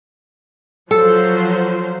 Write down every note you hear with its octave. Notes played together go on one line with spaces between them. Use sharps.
F3 F#3 A4 C5